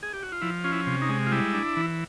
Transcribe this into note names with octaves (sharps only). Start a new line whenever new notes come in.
G#4
G4
F#4
F4
F3 E4
C#4 F4
E4
C3
D#4
G#3
F4
G3 E4
D4
E3